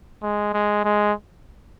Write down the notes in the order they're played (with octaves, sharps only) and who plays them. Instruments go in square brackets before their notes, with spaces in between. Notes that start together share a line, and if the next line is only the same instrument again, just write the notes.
[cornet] G#3
G#3
G#3